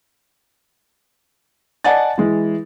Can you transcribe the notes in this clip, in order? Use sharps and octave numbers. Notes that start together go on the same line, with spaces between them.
D5 D#5 F#5 G#5 A5 A6
E3 G#3